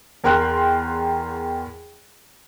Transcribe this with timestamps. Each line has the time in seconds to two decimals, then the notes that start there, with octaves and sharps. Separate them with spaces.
0.24 E2 A#4 G5 C6 F#6